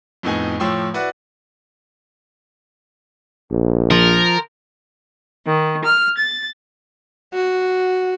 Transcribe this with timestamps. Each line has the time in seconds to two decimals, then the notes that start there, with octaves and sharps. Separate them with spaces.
0.23 F2 A2 B3 D#4 G#4 G#5
0.60 A2 F3 C#5 G5 C6 E6
0.93 E4 F#4 B4 D5 F#5
3.52 A#1
3.91 F3 A#4
5.46 D#3
5.84 F6
6.17 A6
7.33 F#4